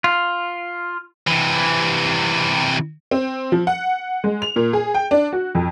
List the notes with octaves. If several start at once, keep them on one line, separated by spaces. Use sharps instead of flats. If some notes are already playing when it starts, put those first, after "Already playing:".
F4
C3 E3
C4
F3
F#5
G#3
F7
A#2
G#4
G5
D4
F#4
F2